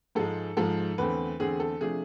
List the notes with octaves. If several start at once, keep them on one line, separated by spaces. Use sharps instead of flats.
G#2 F3 G#3 A4
G#2 F3 G#3 A4
E2 D3 A3 C4 B4
E2 D3 A3 C4 G#4
A4
C3 F3 A3 D4 G#4